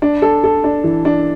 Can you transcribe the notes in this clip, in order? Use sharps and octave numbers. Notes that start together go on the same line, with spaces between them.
D4
A4
A4
D4
E3
D4